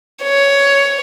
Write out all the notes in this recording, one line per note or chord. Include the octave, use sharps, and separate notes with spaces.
C#5